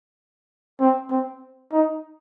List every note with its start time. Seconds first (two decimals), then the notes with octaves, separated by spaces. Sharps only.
0.80 C4
1.11 C4
1.73 D#4